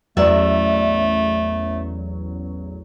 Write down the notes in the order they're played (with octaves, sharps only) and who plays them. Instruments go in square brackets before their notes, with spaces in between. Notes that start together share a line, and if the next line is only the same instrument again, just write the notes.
[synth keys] A1 E2 F#3 [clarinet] A3 [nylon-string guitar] F#4 D5 E5